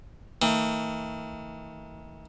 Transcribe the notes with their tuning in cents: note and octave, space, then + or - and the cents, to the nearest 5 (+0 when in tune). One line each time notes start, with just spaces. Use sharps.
D#3 +45 A3 +45